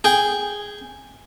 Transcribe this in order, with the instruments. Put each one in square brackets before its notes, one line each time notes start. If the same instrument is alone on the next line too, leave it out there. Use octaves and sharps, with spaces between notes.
[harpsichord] G#4 G5